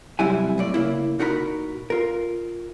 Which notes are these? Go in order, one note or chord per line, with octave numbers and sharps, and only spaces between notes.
B1 F#2 C3 G3 E4 G#5
B1 A2 D5
C#3 A#3 E4
A#2 D#4 F#4 A#4 D5 B5
F4 A#4